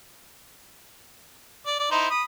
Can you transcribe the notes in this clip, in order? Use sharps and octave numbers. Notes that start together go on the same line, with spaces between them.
D5
D5
D#4 E4 C5
B5 D#6